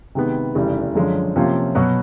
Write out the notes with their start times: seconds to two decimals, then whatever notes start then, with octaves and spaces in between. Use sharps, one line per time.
0.15 C3 D#3 G#3 B3
0.55 F1 D#2 C#3 E3 G3
0.95 F#2 D3 F3 G#3 C#4
1.36 C3 F3 A#3 C#4 F4
1.75 B2 F#3 B3